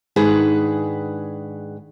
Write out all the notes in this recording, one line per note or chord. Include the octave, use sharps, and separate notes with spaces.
G#2 D#3 D4 G#4 B4 F#5